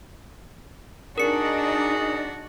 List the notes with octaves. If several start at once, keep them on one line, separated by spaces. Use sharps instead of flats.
D4 D#4 F#4 G#4 A#4 C#7